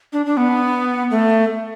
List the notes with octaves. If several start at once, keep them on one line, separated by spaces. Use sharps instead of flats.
D4
D4
B3
A3